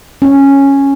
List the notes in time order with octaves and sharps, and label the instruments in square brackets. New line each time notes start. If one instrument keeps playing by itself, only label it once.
[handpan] C#4